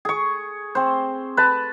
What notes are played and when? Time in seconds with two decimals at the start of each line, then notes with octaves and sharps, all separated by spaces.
0.05 G#4 C#6
0.75 C4 C5
1.37 B4 A5